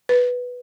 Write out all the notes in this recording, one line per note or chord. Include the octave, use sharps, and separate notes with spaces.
B4